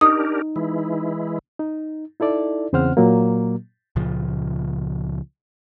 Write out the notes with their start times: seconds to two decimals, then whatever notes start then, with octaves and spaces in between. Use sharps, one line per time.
0.01 D4 D#4 G4 A#4 D#6
0.56 E3 G#3 E4
1.59 D#4
2.20 D#4 E4 A4 D5
2.73 E2 C#3 C4 C5 F#5 F6
2.97 A#2 F#3 A#3
3.96 C#2 A#2 C#3 F3